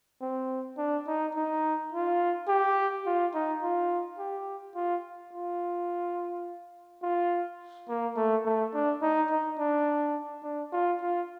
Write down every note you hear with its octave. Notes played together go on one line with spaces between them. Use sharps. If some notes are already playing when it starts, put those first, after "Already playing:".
C4
D4
D#4
D#4
F4
G4
F4
D#4
F4
G4
F4
F4
F4
A#3
A3
A3
D4
D#4
D#4
D4
D4
F4
F4